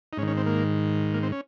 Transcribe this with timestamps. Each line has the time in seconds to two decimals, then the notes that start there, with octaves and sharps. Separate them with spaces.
0.13 D#4
0.17 G#2 C#4
0.22 D#3
0.28 C#4
0.37 C4
0.46 A#3
1.14 A#3
1.23 C4
1.32 C#4